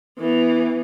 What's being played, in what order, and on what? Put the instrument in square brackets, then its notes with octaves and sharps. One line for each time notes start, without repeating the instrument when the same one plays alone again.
[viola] E3 B3